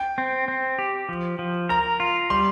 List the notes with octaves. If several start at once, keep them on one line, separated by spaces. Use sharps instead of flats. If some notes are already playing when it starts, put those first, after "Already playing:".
Already playing: G5
C4
C4
G4
F3
F3
A#4 A#5
F4
G3 C6